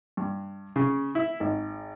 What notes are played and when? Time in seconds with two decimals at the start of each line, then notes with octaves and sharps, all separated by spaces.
0.17 G2
0.76 C#3
1.15 E4
1.40 G#1